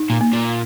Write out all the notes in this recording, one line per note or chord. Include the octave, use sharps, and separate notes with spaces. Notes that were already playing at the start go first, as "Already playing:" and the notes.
Already playing: D#4
A#2
A#3
A#2